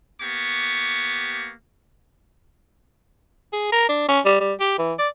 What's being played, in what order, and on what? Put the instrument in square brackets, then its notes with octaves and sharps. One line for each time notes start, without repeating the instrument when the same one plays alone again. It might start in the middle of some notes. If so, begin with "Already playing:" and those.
[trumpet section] A#3 B3 G4 C#6
[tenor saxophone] G#4
A#4
D4
C#4
G3
G3
G4
E3
D5